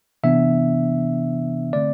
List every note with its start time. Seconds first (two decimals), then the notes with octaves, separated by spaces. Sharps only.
0.23 C3 E3 B3 D4 E5
1.73 D3 A3 C4 D5